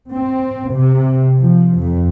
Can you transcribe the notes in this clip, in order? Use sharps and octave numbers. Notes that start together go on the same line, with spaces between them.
C4
C3
F3
F2